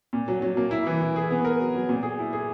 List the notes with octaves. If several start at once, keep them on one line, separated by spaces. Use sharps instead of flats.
A#2
F#3
F#3
A#3
E4
E3
E3
G#4
B3
A#4
F#3
F#3
A#2
G#4
E4
G#4